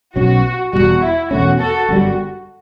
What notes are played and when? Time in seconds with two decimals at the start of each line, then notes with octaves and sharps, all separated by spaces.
0.16 B1 B2 F#3 C#4 F#4
0.73 E1 E2 B2 G3 F#4
1.03 E4
1.31 E2 B2 A3 C#4 F#4
1.60 F#4 A4
1.88 G1 F#2 D3 G3 F#4